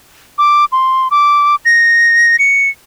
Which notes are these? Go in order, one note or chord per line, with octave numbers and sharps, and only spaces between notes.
D6
C6
D6
A#6
C#7